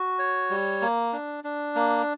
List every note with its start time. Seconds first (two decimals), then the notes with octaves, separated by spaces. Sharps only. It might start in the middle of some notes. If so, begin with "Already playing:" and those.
Already playing: F#4
0.19 C#5
0.50 G3
0.81 A#3
1.13 D4
1.44 D4
1.75 A#3